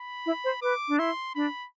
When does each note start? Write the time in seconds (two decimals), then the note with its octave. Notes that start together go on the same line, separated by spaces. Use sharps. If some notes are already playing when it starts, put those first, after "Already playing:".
Already playing: B5
0.26 E4
0.44 C5
0.62 B4 D6
0.88 D4
0.99 E4 C6
1.35 D4 B5